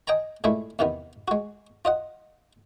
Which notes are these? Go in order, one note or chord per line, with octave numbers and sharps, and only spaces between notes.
D#5 G5 G#5 A#5
A#2 G#3 A3 E4
E2 C3 D#3 B3
G#3 F#4
F4 D#5 F#5